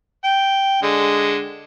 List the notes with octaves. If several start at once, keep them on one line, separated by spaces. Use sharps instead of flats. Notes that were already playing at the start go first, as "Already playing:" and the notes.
G5
D3 G#3